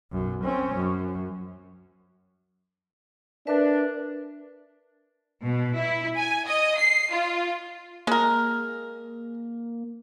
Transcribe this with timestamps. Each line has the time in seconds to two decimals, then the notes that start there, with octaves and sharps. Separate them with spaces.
0.12 B1 F#2
0.44 C4 C#4
0.75 F#2
3.47 D4 A#4 B4 E5
5.43 B2
5.76 E4
6.16 G#5
6.46 D#5
6.77 C7
7.11 F4
8.07 G#3 A#3 A#4